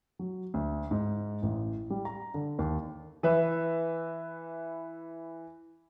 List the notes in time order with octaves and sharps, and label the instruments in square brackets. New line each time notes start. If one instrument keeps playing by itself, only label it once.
[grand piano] F#3
D2
G#2
A1
G3
A#5
D3
D#2
[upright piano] E3 B4 E5